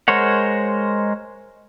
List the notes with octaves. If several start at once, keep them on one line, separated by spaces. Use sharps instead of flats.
G#3 A#4 C5 C#5 F#5